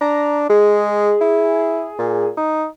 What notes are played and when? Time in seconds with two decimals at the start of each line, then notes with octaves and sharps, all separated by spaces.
0.01 D4 A#5
0.50 G#3 G#4
1.21 E4
1.99 A#2
2.37 D#4